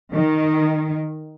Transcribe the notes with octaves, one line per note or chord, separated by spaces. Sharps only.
D#3